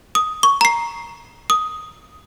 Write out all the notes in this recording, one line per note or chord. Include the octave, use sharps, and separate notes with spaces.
D#6
C#6
A#5 C7
D#6